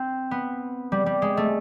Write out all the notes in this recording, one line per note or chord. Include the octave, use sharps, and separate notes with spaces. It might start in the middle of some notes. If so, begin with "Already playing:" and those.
Already playing: C4
B3
G3
G3
G#3
A3